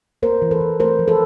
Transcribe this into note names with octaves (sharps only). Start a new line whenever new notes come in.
A#3 A#4 C5
E3
A4 B4
E3
A3 A#4 C5
F3
A4 B4